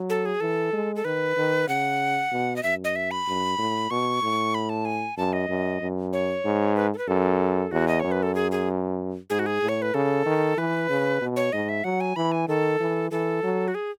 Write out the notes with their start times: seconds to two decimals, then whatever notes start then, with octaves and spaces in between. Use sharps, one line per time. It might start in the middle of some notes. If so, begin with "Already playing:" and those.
Already playing: F#3
0.10 A4
0.26 G#4
0.40 E3 A4
0.73 G#3
0.96 A4
1.05 D#3 B4
1.36 D#3
1.68 C#3 F#5
2.32 B2
2.56 D#5
2.63 F#2 E5
2.84 D#5
2.96 E5
3.11 B5
3.27 F#2
3.58 A2
3.90 B2 C#6
4.22 A2
4.54 B5
4.69 A5
4.85 G#5
5.17 F#2 A5
5.33 D#5
5.49 F#2
5.81 F#2
6.13 C#5
6.45 G#2
6.76 B4
6.94 A4
6.98 B4
7.08 F#2 A4
7.71 E2 F#4
7.88 D#5
8.00 F#2 C#5
8.12 B4
8.23 A4
8.35 G#4
8.52 G#4
9.30 G#2 G#4
9.39 F#4
9.46 G#4
9.62 A2
9.69 C#5
9.82 B4
9.94 C#3 A4
10.26 D#3
10.57 E3 B4
10.89 C#3
11.21 B2
11.36 C#5
11.53 G#2 D#5
11.69 E5
11.84 F#3 F#5
12.00 G#5
12.16 E3 B5
12.32 G#5
12.48 D#3 A4
12.80 E3
13.11 E3 A4
13.43 F#3
13.68 F#4
13.75 G#4